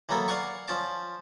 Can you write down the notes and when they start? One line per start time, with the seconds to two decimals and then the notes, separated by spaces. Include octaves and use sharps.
0.09 E3 F#3 A#3 B3 A4
0.28 D5 F5 F#5 G#5 C#6
0.68 F3 C#4 A5 D6